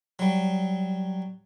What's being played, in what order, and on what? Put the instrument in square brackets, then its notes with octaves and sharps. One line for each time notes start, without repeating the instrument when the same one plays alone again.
[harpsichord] F#3 G3